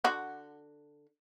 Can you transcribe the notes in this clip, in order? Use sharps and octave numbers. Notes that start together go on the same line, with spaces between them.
D3 F#4